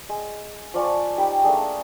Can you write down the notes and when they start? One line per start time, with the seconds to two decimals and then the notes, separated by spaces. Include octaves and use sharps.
0.09 G#3
0.74 F3 D5 G#5 C#6
1.17 D#4 G4 G5 B5
1.44 A3 A#3 D4 G#4